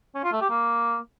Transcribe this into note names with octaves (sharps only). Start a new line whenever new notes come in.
C#4
F4
A3
G4
A#3